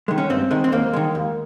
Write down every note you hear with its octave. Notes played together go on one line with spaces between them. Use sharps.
D#3 G#3
C#4
G2 C4
D#3 G#3
C4
D#2 A#3
D#3 G#3
D#2